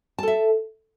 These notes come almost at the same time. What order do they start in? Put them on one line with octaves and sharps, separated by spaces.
A5 A4 E5